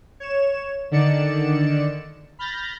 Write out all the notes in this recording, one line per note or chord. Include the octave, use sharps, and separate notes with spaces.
C#5 E7
D3 D#3 D5 C#7 E7
B5 F6 G6 A6 A#6